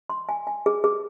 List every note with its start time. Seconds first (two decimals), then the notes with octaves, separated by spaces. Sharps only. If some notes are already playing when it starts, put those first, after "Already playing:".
0.10 C6
0.29 G#5
0.47 G#5
0.66 G#4
0.84 G#4